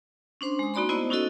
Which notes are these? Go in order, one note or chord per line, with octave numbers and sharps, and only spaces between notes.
C#4 D4 C5 C6
G#3 D#6
A#3 D#4 F#4 D5 B5 C6
A3 B3 E4 C5 D#5
C#4 D#4 E4 F#4 A4 D#5